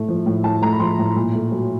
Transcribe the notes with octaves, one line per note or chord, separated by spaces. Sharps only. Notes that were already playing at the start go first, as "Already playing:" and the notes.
Already playing: A2 A3
F3
A2
A2 A5
A3 A#5
B5
F3 C6
A2
A#2
A3
F#3